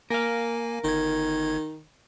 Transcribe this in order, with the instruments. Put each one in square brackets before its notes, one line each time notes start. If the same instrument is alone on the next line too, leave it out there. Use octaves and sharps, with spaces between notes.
[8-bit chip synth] A#3 G#5 [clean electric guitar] A#4 F5
[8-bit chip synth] G1 G#6 [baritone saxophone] D#3